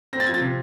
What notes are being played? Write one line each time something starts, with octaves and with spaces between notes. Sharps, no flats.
C4 A#6
A6
F3 G#6
A6
C3